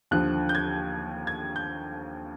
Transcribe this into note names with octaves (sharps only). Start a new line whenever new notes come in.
D#2 D3 F3 F#6
G6
G#6
G#6
G6